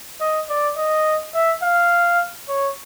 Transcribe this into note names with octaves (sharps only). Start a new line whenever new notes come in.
D#5
D5
D#5
E5
F5
C#5